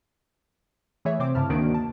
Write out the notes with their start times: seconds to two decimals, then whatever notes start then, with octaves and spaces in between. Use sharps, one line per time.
1.05 E3 A3 G#4 C#5 E5
1.19 C3 C4 C5 D6
1.35 G2 C#3 E4 A5 F6
1.50 D2 D#3 A#3 D4 F#4 D7
1.74 A5